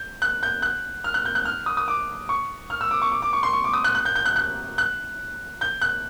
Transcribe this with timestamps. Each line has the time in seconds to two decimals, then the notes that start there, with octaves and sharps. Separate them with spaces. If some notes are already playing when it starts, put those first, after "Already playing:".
Already playing: G6
0.22 F#6
0.43 G6
0.62 F#6
1.04 F6
1.14 F#6
1.25 G6
1.35 F#6
1.45 F6
1.66 D#6
1.77 D#6
1.88 D6
2.29 C#6
2.70 F6
2.81 E6
2.91 D6
3.02 C#6
3.12 D6
3.22 D6
3.33 C#6
3.43 C6
3.53 C#6
3.64 D6
3.73 D#6
3.84 F#6
3.95 F#6
4.05 G6
4.16 G6
4.25 F#6
4.36 F#6
4.78 F#6
5.61 G6
5.82 F#6